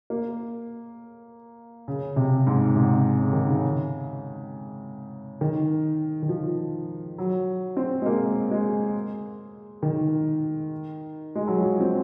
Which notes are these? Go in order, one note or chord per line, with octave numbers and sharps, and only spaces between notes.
A#3
C#3
C3
G#2
C3
C#3
D#3
C#3
D#3
D#3
F3
F#3
C4
G#3
A#3
G#3
D#3
G#3
F#3
F3
C4